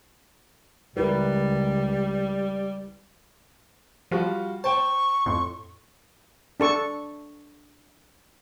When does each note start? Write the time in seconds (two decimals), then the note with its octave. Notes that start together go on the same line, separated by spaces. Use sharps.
0.97 C#2 G3 E4 A#4 B4
4.11 F3 G3 F4 F#4
4.64 C5 G5 A5 C#6
5.26 F2 A2 C6
6.60 D4 A4 C#6